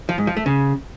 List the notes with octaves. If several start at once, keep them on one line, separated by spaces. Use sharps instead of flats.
F3
G#2
F3
A3
C#3